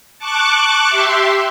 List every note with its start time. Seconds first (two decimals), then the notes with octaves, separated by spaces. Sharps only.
0.19 A5 C#6 D6 F#6 A6
0.89 G4 E5 C6